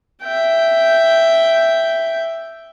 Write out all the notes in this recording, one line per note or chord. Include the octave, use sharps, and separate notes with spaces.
E5 G5